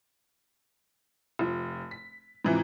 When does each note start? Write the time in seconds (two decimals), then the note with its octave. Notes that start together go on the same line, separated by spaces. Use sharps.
1.39 F1 F3
1.91 B6
2.45 G#2 C3 E3 F3